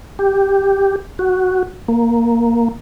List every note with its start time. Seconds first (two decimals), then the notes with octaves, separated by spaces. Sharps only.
0.19 G4
1.19 F#4
1.88 A#3